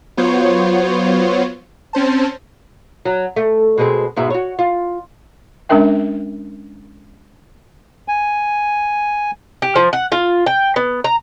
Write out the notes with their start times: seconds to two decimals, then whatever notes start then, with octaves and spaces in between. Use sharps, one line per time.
0.17 F#3 B3 F4 C5 C#5
1.93 C4 C#4 C5 A5
3.05 F#3
3.36 A3
3.78 B2 G#3 C4
4.17 G#2 B2 E4
4.30 F#4 C#5
4.59 F4
5.69 G#3 C#4 D4 A#4 E5 G5
8.08 G#5
9.62 G4
9.76 F3
9.93 F#5
10.12 F4
10.46 G5
10.76 B3
11.04 A#5